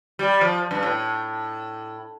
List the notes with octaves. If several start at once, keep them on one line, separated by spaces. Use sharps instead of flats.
G3
F3
G2
A2